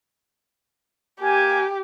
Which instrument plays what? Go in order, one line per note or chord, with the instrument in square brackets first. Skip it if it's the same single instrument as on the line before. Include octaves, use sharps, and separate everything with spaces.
[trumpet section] A#3 G#5 [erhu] G4